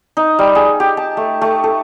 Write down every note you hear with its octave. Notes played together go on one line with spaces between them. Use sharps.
D#4
G3
G#4
G4
A5
A3
A3
A4